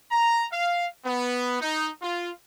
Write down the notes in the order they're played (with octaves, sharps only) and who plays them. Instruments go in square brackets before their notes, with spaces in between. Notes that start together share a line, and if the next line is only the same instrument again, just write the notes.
[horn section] A#5
F5
B3
D#4
F4